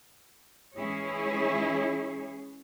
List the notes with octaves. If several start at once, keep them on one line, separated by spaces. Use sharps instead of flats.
E3 G#3 C#4 E4 G#4 C#5